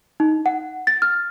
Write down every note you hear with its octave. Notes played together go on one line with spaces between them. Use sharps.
D#4
F#5
A6
F6